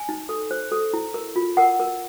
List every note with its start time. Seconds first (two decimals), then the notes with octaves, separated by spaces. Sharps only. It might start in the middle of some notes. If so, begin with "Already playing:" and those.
Already playing: G#5
0.09 D#4
0.29 A4
0.51 C5
0.72 A4
0.93 E4
1.14 A#4
1.36 F4
1.57 A#4 F#5
1.80 A#4